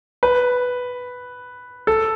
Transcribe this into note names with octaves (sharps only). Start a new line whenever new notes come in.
B4
A4